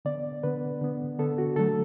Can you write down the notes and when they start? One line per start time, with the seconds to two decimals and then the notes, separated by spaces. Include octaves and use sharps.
0.05 D3 B3 D5
0.43 D3 B3 B4
0.81 D3 B3
1.19 D3 B3 A4
1.38 F#4
1.56 D3 F#3 A3 A4